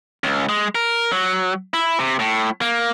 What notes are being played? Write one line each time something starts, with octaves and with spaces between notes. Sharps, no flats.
C#2
G#3
A#4
F#3
E4
C3
A2
A#3